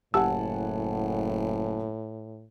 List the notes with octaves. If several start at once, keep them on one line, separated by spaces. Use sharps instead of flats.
F#1 A2 G4 F#5 G#5 A5 E6